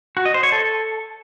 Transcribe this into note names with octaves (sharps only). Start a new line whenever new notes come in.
F#4
D#5
C5
C#5
A4